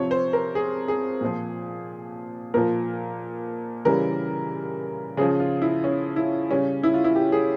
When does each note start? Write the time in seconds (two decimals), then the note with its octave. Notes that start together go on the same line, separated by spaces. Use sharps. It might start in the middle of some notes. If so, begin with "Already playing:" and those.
Already playing: C3 F3 C#5
0.11 C5
0.33 A#4
0.55 G#4
0.88 G#4
1.21 A#2 F3
2.54 A#2 F3 A#4
3.85 C#3 E3 G3 A#4
5.17 C#3 F3 G#4
5.40 F4
5.62 E4
5.84 C#4
6.16 E4
6.49 C#3 G3 C#4
6.83 E4
6.94 F4
7.04 E4
7.15 G4
7.32 G#4